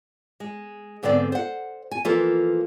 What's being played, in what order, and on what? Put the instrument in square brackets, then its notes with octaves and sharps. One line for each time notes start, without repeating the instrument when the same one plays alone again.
[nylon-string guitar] G#3
G#2 D3 B3 C4 D5
C5 F#5
G#5
E3 F3 A#3 F4 A4 B4